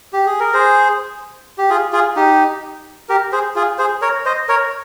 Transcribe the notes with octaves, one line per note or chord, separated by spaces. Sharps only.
G4
G#4
A#4
G#4 C5
G4
F4 G#4
F4 G#4
D#4 G4
G4 A#4
G#4 C5
F4 G#4
G#4 C5
A#4 C#5
C5 D#5
A#4 C#5